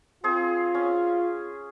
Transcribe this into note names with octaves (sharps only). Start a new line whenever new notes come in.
C4 F4 G#4
C#4